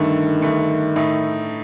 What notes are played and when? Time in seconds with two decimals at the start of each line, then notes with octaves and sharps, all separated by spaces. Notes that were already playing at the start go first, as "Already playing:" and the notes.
Already playing: G2 D3 D#3 A3
0.42 G2 D3 A3
0.96 A2 A3 D#4